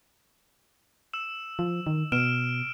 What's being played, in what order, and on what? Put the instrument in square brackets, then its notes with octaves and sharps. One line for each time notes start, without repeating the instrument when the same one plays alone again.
[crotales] E6 E7
[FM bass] F3
D#3
[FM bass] B2 [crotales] F6 D7 E7